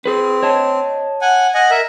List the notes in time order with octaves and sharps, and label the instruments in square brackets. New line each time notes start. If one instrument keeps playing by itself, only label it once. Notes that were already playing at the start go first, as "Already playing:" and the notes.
[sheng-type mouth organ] C4 [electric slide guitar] G#4 B4
[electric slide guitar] C#5 D#5 A5
[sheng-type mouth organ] F#5 G#5
D#5 F#5 G#5
A#4 E5